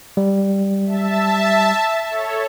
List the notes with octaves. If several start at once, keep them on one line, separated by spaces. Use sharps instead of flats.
G3
E5 A5
A4 C#5